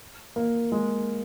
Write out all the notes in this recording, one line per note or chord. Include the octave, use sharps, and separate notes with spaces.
A#3
G#3